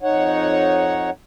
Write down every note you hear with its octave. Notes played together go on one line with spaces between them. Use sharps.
F2 D#4 C#5 F#5